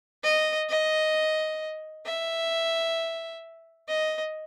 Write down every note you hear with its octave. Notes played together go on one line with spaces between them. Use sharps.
D#5
D#5
E5
D#5